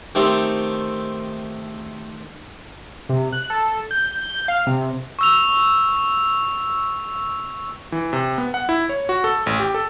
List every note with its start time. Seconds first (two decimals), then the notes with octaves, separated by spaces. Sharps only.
0.15 D#3 A3 C4 G4
3.09 C3
3.33 F#6
3.50 A4
3.91 G6
4.48 F5
4.67 C3
5.19 C#6 E6 F7
7.92 E3
8.13 C3
8.38 B3
8.54 F#5
8.69 E4
8.89 C#5
9.09 F#4
9.24 A4
9.46 A1
9.59 G4
9.74 A4